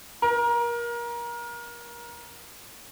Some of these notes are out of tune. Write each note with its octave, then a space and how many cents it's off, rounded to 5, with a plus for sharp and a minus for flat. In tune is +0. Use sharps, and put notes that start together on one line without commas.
A#4 +25